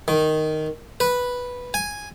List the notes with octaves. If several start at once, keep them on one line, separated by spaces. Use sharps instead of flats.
D#3
B4
G#5